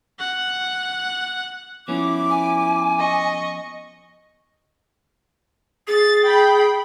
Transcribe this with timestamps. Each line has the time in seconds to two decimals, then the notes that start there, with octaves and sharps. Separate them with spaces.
0.20 F#5
1.88 F3 B3 C#4 E4 D6
2.30 G#5
2.99 D#5 C#6
5.87 G#4 A6
6.26 G5 B5